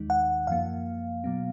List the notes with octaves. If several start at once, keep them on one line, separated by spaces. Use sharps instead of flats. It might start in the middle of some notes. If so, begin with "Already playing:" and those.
Already playing: D#2 D#3 G#3 D#4
F#5
F#2 F3 A#3 F5
B2 F#3 B3